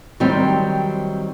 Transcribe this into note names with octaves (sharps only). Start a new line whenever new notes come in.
D#3 F#3 G3 C4